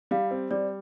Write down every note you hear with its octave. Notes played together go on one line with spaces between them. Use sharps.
G3 F5
C4
G3 D5